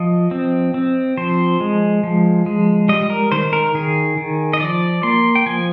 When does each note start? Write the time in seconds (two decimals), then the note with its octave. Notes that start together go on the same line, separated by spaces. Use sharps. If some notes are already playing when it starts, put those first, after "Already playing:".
Already playing: F3 D#5
0.31 C4
0.74 C4
1.17 F3 C5
1.60 G#3
2.03 F3
2.46 G#3
2.89 G3 D#5
3.10 A#4
3.32 D#3 C5
3.53 A#4
3.74 D#3 G#4
4.18 D#3
4.53 D#5
4.60 F3 D5
5.03 A#3 C6
5.35 G5
5.46 F3 G#5